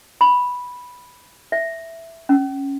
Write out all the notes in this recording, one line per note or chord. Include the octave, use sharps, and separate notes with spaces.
B5
E5
C#4